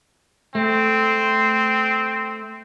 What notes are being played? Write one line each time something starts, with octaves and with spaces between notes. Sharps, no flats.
A3 C4